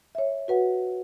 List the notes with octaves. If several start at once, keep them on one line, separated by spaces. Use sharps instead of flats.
C#5 E5
F#4 B4 F#5